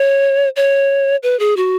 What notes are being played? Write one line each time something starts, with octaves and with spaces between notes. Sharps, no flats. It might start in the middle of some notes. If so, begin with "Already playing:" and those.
Already playing: C#5
C#5
B4
G#4
F#4